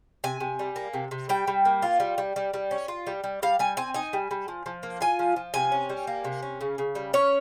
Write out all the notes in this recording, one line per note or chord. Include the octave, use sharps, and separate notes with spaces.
C3 G#5
C3
G3
A#3
C3
C3
G3 G5
G3
A#3
F4
G3
G3
G3
G3
C#4
F4
G3
G3
G3 F5
G3 G#5
C4 G#5
D#4 G#5
G3
G3
F3
F3
A#3
F4 G#5
F3
F3
C3 G#5
C#4
G3
A#3
C3
C#4
C#3
C#3
G3
C#4 C#5